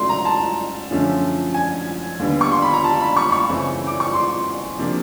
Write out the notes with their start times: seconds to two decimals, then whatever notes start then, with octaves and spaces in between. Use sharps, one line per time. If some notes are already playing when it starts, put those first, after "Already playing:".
Already playing: C#3 F#3 A3 C6
0.09 A#5
0.25 A5
0.90 F#2 D3 F3 A3 C#4
1.54 G#5
2.19 D#2 D3 G3 B3
2.41 C#6
2.52 C6
2.62 B5
2.73 A#5
2.84 A5
3.00 B5
3.16 C#6
3.32 C#6
3.49 F#2 C#3 E3 A3 C4
3.87 D6
4.00 C#6
4.14 C6
4.78 C3 F3 A#3 D4